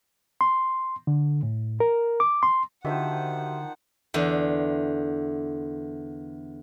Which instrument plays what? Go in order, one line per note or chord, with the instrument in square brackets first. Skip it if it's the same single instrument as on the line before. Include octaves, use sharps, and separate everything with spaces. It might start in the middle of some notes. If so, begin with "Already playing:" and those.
[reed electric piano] C6
D3
A2
A#4
D6
C6
[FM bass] D3 [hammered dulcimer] D#3 F3 C5 [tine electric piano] F#4 G4 E5 [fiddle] F#5
[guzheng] E2 D3